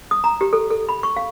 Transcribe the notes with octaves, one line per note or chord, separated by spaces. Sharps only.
D#6
A#5
G4
A4
A4
B5
C#6
F5